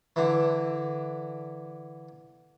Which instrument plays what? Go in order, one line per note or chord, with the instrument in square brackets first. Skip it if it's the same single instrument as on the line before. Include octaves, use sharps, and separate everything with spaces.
[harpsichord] D3 E3